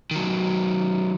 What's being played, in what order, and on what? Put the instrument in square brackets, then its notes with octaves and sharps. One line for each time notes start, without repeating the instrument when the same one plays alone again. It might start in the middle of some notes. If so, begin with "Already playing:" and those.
[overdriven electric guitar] D#3 F#3